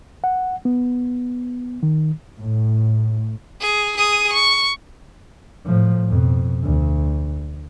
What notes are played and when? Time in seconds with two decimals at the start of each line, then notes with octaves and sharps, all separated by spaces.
0.24 F#5
0.65 B3
1.83 D#3
2.38 A2
3.61 G#4
3.97 G#4 D#6
4.33 C#6
5.66 A2 F3
6.09 F2 B2
6.63 D2